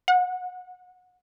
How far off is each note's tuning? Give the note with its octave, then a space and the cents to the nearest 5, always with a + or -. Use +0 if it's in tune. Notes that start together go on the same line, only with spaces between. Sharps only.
F#5 -25